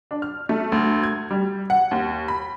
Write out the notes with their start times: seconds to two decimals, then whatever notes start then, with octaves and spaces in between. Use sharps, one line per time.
0.11 D4
0.22 F6
0.49 A3
0.72 D2
1.03 G#6
1.31 G3
1.70 F#5
1.91 D#2
2.28 B5